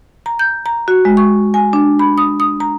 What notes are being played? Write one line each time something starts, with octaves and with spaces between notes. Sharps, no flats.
A#5
G6
A#5
F#4
G#3
C#6
G#5
D4
B5
D#6
D#6
A#5